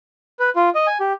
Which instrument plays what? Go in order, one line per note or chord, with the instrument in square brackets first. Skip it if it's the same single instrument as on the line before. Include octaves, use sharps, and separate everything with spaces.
[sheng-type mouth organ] B4
F4
D#5
G#5
G4